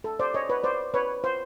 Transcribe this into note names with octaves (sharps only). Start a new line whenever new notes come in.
A4
C5 D5
C#5 D#5
B4 C#5
C5 D5
B4 C#5
C5